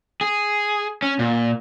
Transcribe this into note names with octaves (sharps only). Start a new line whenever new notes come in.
G#4
C#4
A#2